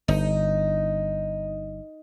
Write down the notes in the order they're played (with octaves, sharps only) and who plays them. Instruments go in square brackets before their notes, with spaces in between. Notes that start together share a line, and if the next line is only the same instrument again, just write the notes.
[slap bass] G1 [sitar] D#4